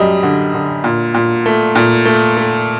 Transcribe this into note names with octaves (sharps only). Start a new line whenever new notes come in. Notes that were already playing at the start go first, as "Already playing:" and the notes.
Already playing: F#2 G3 D#5
D3
D3
A#2
A#2
A3
A#2
A3
A3